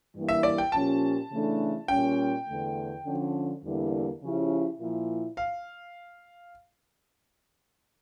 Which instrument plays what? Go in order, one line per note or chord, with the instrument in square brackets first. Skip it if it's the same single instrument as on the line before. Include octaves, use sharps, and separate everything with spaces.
[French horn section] G2 E3 G3 A#3 E4
[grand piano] E5
D5
G5
[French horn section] A#2 F3 C#4 G4 [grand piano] A5
[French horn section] C#3 E3 A3 D4
[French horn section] A#2 G3 C#4 [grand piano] G5
[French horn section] E2 D3 A3
D3 F3 C#4
E2 D3 G3 A#3 E4
C#3 F3 C#4 E4 G4
A#2 F3 A#3 E4
[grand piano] F5